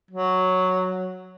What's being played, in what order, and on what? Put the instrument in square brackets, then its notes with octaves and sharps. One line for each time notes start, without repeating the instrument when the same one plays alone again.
[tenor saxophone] F#3